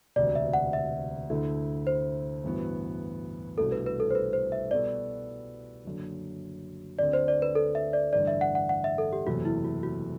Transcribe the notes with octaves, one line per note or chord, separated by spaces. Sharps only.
E1 D2 C3 D5
E5
F#5
E5
D2 D3 A3 E4
C5
A1 G2 E3 B3 F#4
C2 B2 A3 D4 F#4 A4
B4
B4
A4
C5
B4
C5
E5
B2 G3 B3 F#4 A4 D5
F#1 F#2 D3
D2 D3 A3 C4 D5
C5
D5
B4
A4
E5
D5
A1 G2 D3 D5
E5
F#5
F#5
F#5
E5
A4
G4
F#1 E2 C3 F#3 A3 F#4
E4
F#4
F#4